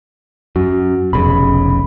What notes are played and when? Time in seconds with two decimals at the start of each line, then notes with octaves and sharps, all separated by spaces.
0.56 F#2 F#4
1.13 F1 B1 C#3 B5